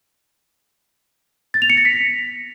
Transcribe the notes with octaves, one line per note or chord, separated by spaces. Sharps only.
A6
F7
C#7
A#6
B6